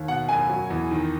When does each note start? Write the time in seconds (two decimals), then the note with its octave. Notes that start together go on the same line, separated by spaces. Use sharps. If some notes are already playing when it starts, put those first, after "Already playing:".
Already playing: D#2
0.08 B2 F#5
0.29 F#1 G#5
0.50 F#3
0.70 E2
0.91 D#3